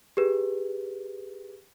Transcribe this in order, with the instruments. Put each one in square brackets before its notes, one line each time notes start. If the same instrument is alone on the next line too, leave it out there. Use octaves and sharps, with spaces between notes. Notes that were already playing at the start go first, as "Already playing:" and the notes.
[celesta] G4 G#4 B4